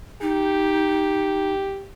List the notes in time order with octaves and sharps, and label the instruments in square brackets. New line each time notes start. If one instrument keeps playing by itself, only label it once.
[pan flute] D#4 [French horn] G4